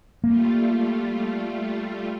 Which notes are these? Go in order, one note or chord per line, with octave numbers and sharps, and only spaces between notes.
G3 A3 A#3 F4